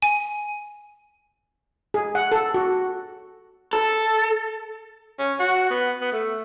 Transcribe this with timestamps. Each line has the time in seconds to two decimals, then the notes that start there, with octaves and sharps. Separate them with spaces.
0.02 G#5
1.94 G#4
2.15 F#5
2.32 A4
2.54 F#4
3.73 A4
5.19 C#4
5.40 F#4
5.70 B3
6.01 B3
6.12 A3